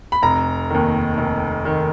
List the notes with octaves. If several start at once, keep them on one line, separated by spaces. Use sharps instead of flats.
B5
F1 A#5
D#2 D#3
F1
D#3